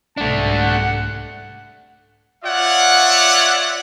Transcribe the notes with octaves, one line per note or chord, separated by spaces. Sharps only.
C2 G#2 A3 D4 A5
F#5
F4 C#5 D5 E5 F#5